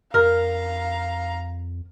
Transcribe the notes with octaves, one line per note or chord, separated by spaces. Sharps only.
F2 A#4 F5 A#5